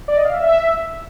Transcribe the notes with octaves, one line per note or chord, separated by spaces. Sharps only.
D5
D#5
F5
E5